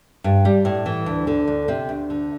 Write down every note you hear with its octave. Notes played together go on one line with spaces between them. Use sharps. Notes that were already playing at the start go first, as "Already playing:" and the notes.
G2
G3
A2
E3
D2
D3
D2
C3
D2
D3